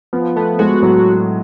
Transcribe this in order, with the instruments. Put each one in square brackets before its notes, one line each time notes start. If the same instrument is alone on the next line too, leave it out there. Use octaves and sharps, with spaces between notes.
[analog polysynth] F3 [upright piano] B3
[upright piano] A3 [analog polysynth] B3
[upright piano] G#3 [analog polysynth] F#4
[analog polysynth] A2 [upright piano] F#3